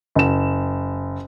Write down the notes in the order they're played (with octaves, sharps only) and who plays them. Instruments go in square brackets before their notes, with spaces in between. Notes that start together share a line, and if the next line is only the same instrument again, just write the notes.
[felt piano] F#1 E7